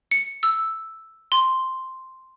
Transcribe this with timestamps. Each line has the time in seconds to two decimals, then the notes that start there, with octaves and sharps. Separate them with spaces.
0.11 C#7
0.43 E6
1.32 C6